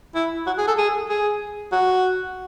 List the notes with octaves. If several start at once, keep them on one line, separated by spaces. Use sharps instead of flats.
E4
F#4
G#4
A4
G#4
G#4
F#4